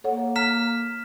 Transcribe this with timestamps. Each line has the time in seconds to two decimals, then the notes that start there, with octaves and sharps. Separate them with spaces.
0.04 A#3 A4 C#5 F#5
0.36 A#5 F6 B6 E7